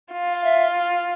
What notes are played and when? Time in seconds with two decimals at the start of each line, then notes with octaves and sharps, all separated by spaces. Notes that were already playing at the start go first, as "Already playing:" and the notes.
0.12 F4
0.33 F5
0.44 E5